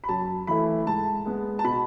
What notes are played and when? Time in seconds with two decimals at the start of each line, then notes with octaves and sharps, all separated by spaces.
0.04 B5
0.09 F#2 A5
0.47 E3 A3 E4 B5
0.86 G#2 A5
1.25 G#3 B3
1.59 A5
1.64 B2 B5